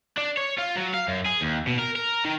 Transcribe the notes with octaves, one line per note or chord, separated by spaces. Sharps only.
D4
C#5
F4
F#3
F5
F#2
G#4
D#2
B2
A#4
A#4
D#3